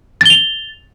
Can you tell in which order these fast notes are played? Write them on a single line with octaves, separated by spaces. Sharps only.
A6 G7 F7